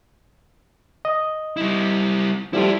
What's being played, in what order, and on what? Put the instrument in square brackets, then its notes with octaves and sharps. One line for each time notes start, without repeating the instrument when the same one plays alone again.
[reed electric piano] D#5
[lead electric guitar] G3 E4
[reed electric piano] F3 G3 A3 [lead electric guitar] E4 F4